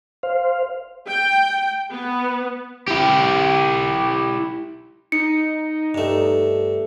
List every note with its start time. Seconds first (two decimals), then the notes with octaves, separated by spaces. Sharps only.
0.23 C5 F5
1.07 G5
1.91 B3
2.88 E4 G4
5.12 D#4 C#7
5.94 G2 A3